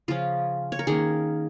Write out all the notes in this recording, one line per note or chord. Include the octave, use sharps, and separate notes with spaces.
C#3 F3 C#4 F4
C#5
A#4
D#3 A#3 C#4 G#4